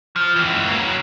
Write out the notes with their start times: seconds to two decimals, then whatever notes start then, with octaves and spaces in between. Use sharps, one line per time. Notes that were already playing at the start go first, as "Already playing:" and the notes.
0.16 F3
0.36 C#2 E3
0.68 F#3 A#3